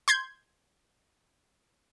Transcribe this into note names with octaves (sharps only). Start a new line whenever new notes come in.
C6 G6 G#6